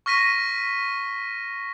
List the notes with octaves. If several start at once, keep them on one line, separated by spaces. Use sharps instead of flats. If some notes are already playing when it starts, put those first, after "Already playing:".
C#6 F6 A#6 B6 D#7